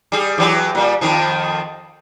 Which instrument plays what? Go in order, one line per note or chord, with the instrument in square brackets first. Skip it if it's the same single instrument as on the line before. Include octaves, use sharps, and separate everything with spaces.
[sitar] G3 G#4
E3 F#3 G4
A#2 G3
F2 D#3 F3